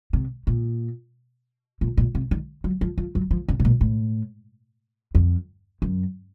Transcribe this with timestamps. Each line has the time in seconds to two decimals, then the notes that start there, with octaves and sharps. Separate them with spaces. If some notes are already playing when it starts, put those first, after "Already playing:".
0.13 C3
0.47 A#2
1.81 A#2
1.97 A#2
2.15 C3
2.31 D#3
2.64 F#3
2.81 F3
2.98 F3
3.15 F#3
3.31 F3
3.48 C#3
3.60 C3
3.65 A#2
3.81 A2
5.15 F2
5.82 F#2